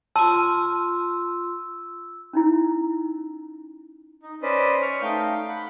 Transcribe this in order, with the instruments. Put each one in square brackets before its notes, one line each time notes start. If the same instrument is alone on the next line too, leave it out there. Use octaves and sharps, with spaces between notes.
[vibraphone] F4 C6 [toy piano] A5 [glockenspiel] E6
[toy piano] C#4 D#4 E4
[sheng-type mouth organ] D#4
C#4 B4 C5 D5 D#5
C#6 F6
A3 D#4 F5 G5 G6
F#5 B5